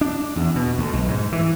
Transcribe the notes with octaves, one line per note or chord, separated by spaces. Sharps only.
D4
E2
B2
D2
B1
G#2
E3